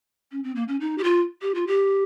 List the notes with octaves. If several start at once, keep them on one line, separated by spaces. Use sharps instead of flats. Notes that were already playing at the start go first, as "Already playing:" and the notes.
C#4
C4
A#3
C#4
D#4
G4
F4
G4
F4
G4